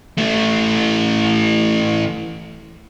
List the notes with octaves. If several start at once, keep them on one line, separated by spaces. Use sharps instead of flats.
E3 A3